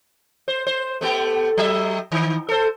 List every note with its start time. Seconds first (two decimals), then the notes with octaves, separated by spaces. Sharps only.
0.48 C5
0.67 C5
1.01 A3 B3 G4
1.57 F#3 E5
2.12 D#3
2.49 A4 C5